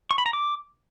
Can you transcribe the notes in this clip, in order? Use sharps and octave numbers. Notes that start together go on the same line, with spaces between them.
C#6
B5
A#5
D6